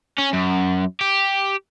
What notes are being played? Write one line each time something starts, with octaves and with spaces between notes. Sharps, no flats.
C#4
F#2
G4